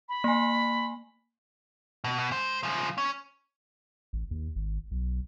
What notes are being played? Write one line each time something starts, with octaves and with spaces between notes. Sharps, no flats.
B5
A#3 G#5
B2
B2
G#2 C5
C#3 F3
C#4
A1
D#2
G#1
B1